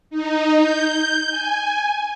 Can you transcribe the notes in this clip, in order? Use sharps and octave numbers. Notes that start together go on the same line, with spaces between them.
D#4
G6
G#5